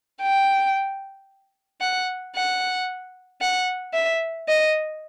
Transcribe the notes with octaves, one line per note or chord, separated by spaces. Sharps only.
G5
F#5
F#5
F#5
E5
D#5